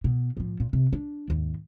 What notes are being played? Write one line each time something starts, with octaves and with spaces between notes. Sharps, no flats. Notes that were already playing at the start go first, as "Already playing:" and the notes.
B2
A2 F3
A#2
C3
D4
D#2 G#2